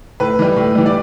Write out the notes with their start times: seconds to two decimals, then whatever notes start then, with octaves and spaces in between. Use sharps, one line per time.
0.20 A2 B4
0.39 E3 G3
0.56 A2
0.75 E3 G3
0.86 D5